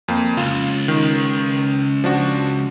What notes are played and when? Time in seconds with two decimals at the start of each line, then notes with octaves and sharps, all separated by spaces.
0.08 F2 A#3
0.37 C#2 F4
0.88 D#3
2.04 F3 D4 F#4